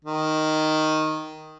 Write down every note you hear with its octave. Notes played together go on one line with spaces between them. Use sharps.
D#3